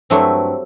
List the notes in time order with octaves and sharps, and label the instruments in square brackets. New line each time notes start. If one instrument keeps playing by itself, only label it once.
[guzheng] G2 F#3 A3 C4 E4